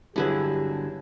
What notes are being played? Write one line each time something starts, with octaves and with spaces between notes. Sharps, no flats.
G2 D3 F#3 E4 G4 G#4 B4